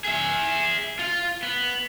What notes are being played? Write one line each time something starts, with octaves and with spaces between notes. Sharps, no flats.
G#4 E5
F4
B3